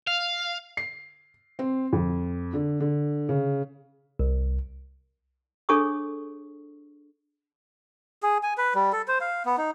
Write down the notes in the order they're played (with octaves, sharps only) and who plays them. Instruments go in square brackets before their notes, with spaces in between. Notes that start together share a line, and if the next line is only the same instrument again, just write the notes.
[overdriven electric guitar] F5
[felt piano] C7
C4
F2
D3
D3
C#3
[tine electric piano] C2
[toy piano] D4 G#4 A4 C#5 C#6 D#6
[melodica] G#4
G#5
B4
G3
A4
C5
F5
B3
D#4